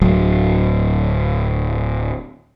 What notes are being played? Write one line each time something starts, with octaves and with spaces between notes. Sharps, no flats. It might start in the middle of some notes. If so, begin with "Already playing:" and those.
D1 F#3